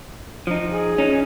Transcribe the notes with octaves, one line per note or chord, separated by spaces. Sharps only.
F3 D#4
G#4
C#4 D#4